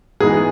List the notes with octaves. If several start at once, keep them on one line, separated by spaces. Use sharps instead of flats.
G#2 E3 G#3 B3 D#4 G#4